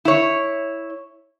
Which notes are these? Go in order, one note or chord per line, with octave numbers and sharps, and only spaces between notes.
E4 C#5